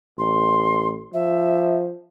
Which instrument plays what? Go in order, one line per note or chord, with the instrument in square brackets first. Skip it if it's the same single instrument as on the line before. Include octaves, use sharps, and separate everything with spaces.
[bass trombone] A1 [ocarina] C6
[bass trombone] F3 [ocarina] E5